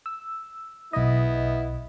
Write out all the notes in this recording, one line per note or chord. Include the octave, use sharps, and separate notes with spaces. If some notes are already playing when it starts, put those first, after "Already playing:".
E6
B1 B3 E4 D#5